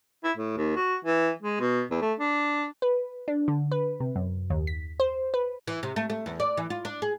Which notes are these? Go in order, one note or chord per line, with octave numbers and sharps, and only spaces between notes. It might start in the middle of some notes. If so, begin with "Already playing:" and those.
E4
A2
D#2
F#4
E3
G#3
B2
E2
A3
D4
B4
D4
D3
B4
C3
F#2
D#2
B6
C5
B4
E3
C3
A3
A3
E2
D5
E3
F4
D4
G#4